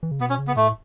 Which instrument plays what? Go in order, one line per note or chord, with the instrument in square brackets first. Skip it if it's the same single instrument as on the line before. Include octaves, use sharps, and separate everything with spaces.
[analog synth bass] E3
C#3
[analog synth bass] B2 [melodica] B3
[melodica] C#4
[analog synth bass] C#3
[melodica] B3
[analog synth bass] A2 [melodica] A3